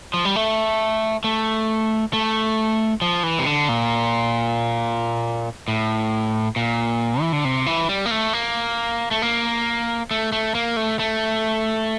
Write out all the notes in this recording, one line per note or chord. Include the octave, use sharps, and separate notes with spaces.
F3
G3
A3
A3
A3
F3
E3
C3
D3
A#2
A2
A#2
E3
D3
C3
E3
G3
A#3
A3
A#3
A3
A#3
A3
A3
A#3
A3
A3